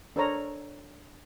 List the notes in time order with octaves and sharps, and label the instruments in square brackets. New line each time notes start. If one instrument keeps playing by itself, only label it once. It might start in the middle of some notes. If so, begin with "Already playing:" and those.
[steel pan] D4 A4 A#4 C5 C#5 A#5